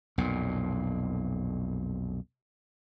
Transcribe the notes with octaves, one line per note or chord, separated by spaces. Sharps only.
B1 F2 A#2